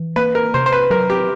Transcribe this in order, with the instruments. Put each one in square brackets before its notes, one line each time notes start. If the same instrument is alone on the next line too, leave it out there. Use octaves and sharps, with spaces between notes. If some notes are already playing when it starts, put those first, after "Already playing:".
Already playing: [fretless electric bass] E3
[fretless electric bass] A#3 [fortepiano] B4
[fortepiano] A#4
[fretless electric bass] C3 [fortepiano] C5
[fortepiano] C5
B4
[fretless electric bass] F#3 [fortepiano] A#4
[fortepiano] G4